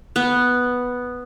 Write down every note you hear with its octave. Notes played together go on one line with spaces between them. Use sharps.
B3